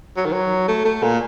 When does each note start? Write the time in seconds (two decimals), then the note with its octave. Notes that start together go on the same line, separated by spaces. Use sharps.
0.17 F#3
0.26 D#3
0.33 F#3
0.68 A3
0.85 A3
1.03 A#2